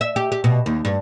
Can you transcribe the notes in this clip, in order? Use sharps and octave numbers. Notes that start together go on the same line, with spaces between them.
E5
G4
G4
B2
D#2
G2